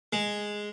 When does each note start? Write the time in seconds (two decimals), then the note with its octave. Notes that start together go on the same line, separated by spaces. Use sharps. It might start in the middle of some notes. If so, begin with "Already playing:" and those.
0.13 G#3